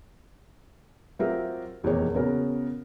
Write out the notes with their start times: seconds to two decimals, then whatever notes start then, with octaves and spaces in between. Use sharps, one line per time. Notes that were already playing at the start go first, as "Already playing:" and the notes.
1.19 F#3 C4 F4 G4 A#4 E5
1.83 F1 E2 B2 A#3 G4 C#5
2.14 C#3 B3 C#4 F#4 A#4